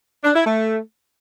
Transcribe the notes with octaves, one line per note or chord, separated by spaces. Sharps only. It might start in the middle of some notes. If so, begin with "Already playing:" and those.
D4
E4
A3